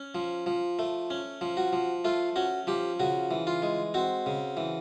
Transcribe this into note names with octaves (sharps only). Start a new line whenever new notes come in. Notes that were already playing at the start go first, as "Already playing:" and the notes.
Already playing: C#4
F3
F3
A3
C#4
F3
F#4
F3
A3 F4
C#4 F#4
F3 G4
C#3 F#4
E3
F4
G#3
C4 F#4
C#3
E3